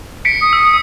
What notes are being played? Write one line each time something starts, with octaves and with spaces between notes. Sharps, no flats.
B6 C#7 D7
D#6
E6